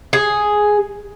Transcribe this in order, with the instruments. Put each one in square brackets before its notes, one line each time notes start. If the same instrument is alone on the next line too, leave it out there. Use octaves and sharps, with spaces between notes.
[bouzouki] G#4